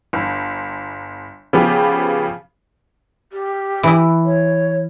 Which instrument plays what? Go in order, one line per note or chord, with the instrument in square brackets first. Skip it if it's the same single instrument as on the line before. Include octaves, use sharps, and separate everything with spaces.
[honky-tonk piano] G1
C#3 F3 B3 G4
[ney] G4
[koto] E3 E4
[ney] C#5